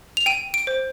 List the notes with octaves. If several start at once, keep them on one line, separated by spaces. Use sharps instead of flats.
F7
G5 D#7
D7
C5